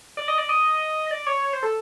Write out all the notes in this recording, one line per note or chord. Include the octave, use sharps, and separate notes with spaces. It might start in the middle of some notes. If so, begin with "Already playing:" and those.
D5
D#5
D5
D#5
D#5
D5
C#5
C#5
C5
A4